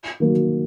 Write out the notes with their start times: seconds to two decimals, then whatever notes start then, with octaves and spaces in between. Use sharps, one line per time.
0.20 D#3 F#3 A#3